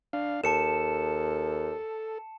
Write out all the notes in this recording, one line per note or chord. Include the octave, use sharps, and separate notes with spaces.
D4 F5
D#2 A4 A5 C#7 E7